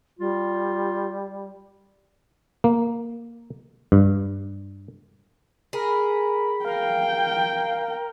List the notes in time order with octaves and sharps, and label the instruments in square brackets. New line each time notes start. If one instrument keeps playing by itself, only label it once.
[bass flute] G3 [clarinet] F4
[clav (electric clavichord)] A#3
G2
[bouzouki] G#4 [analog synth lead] A#4 [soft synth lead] B5
[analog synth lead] A#4 [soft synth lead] F5 [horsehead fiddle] G5